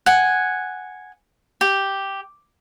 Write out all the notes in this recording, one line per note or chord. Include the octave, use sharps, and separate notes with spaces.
F#5 G#5
G4